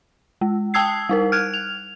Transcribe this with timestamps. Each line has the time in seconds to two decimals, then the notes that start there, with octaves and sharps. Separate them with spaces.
0.41 G#3
0.74 G5 A5 D#6 E6 G#6 C7
1.09 G3 D#4 A#4
1.32 F6 F#6 G#6
1.54 F7